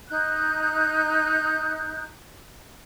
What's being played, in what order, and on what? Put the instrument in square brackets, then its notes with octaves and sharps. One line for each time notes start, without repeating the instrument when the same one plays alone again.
[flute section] D#4 F#6 G6